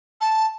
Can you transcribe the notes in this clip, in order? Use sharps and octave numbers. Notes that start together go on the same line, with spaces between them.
A5